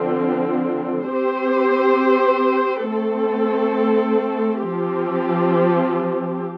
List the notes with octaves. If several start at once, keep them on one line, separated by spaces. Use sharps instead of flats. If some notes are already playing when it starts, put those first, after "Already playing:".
Already playing: D3 F3 C4
C4 G4 C5
A3 C4 A4
F3 C4 G4